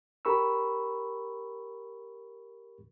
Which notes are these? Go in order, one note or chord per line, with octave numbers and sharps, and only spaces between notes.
G4 A#4 B5 C#6 E6